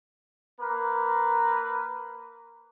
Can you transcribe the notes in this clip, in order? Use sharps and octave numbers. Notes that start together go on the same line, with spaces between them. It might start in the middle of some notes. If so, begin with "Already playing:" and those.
A#3 A#4 B4